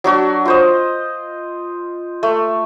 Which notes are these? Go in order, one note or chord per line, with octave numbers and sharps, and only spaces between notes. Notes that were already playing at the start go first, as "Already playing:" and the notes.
F#3 D4 F#4
F4 C5 D#5
A3